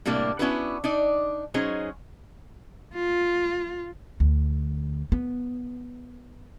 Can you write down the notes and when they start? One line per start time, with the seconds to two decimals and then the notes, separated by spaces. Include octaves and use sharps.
0.05 A2 C3 G3 A#3 D4
0.39 B3 C#4 D4 E4 F#4 B4
0.84 D4 D#4 D5
1.54 F#3 C#4 D#4 G#4 C5
2.94 F4
4.20 D2
5.12 B3